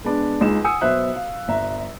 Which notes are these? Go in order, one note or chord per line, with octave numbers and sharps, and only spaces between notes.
G#3 B3 D4
C#2 G#3 D#4 E7
F#5 G#5 D#6 E6 C#7
B1 B3 C5 E5 F#6
F5
G1 E5 A#5